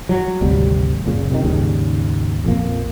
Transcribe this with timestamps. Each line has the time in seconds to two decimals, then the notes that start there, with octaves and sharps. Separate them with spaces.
0.09 F#3
0.41 G#1 D2 C3 G3
1.04 F#1 A#2 C#3
1.30 C3 D#3
1.44 D#2 G#2 C#3 G3
2.45 A#1 F2 A#3